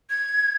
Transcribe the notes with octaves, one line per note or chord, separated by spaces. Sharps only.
G#6